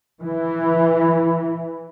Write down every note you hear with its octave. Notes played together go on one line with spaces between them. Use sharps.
E3